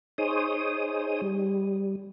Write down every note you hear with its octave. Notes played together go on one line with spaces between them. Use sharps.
D#4 G#4 C5 C#5 D#6
G3